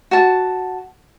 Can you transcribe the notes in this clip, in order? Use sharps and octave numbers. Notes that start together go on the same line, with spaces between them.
F#4 A5